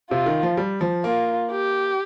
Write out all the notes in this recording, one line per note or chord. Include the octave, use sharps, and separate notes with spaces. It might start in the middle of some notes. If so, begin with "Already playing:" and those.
C3 F4
D#3
F3
G3
F3
A#3 F4
G4